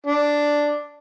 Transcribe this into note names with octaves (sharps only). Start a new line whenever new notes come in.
D4